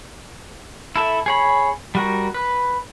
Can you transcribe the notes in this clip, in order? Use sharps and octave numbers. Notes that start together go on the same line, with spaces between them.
E4 A4 E5
G#4 C#5 B5
G3 F#4 A#4
B4